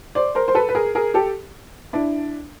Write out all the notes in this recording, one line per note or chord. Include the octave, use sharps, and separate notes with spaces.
C5 D5
A#4 C5
C5
A4 B4
B4
G#4 A#4
G#4 A#4
G4 A4
D4 E4